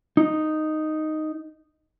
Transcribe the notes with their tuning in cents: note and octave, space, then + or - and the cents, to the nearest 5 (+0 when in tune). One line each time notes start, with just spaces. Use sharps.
D#4 -5